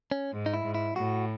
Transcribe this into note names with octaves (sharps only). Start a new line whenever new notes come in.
C#4
G#2
D#4
E4
G#2
E4
A2 F#4